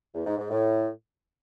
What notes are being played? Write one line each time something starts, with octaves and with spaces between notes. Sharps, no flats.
E2
G#2
G#2
A2